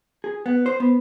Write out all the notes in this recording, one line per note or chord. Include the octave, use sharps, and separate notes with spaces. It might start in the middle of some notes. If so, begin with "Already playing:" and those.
G#4
B3
C5
B3